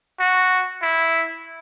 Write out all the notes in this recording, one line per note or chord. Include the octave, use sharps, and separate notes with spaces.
F#4
E4